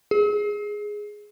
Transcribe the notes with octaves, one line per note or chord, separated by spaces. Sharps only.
G#4